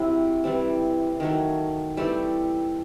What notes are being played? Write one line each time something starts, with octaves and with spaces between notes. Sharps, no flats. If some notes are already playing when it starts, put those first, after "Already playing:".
Already playing: C3 F#3 C4 E4
E3 G3 C4
D#3 F#3 A3
E3 G3 A3 C4 G4